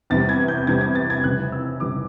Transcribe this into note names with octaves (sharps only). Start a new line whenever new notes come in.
E2 C3 E3 G3 A6
G#6
G6
E2 C3 E3 G3 G#6
G#6
A6
G#6
F1 F2 C#3 E3 G3 F#6
E6
F1 F2 C#3 E3 G3 D6